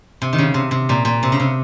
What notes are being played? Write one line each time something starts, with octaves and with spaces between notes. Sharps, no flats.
C3
D#3
C#3
C3
C3
A#2
A#2
C3
C#3
C3